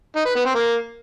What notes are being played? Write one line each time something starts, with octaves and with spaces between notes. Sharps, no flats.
D#4
B4
B3
C4
A#3